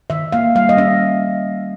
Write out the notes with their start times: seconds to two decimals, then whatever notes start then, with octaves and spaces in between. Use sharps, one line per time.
0.10 D#3 E5
0.32 A#3 F5
0.55 G3 F5
0.69 D#5
0.77 C#4 E5